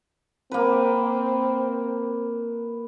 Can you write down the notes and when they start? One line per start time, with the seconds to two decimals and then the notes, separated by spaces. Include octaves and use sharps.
0.52 A#3 C4 B4